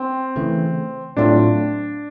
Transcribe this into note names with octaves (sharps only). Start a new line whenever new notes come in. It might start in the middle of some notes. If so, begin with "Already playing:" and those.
Already playing: C4
C#3 E3 A3
A2 F#3 A3 C4 D4 F4